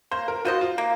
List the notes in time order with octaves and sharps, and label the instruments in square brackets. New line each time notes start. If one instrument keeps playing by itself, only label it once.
[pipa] A#3 [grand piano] C5
[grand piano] A#4
[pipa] F4 C5 D#5 [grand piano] F#4
[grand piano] F4
[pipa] A#3